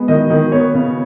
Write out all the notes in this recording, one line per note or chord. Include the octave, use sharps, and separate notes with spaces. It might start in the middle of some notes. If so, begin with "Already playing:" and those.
Already playing: G#3 B3
D#3 D#5
D#3
B3 C#5
C#3